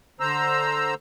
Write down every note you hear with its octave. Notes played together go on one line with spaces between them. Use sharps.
D3 C5 A#5 E6